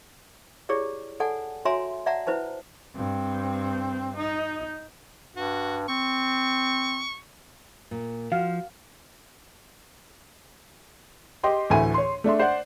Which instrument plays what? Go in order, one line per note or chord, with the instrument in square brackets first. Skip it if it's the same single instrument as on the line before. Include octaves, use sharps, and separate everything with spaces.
[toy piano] E4 G4 G#4 C#5 D5
A4 D5 F#5 G#5 A5
F#4 C#5 E5 G#5 A#5 C6
D5 E5 F#5 A5 A#5
E4 B4 C5 A5
[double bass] G2 C4
D#4
[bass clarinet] G2 [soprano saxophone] F#4
[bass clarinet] C4 [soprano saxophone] C#6
[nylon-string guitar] A#2
[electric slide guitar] F3 [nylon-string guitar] F#4 [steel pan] F5
[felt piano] G4 D#5 G5 C6
D2 A2 E3 A3 G#5 D#7
C#5 C6
A3 D4 E5 C6
C5 D5 F#5